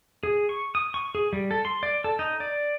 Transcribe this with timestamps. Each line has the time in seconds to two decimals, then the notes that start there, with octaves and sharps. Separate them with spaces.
0.23 G#4
0.49 C#6
0.75 D#6
0.94 C#6
1.15 G#4
1.33 G3
1.51 A4
1.65 C6
1.83 D5
2.04 A4
2.19 D#4
2.40 D5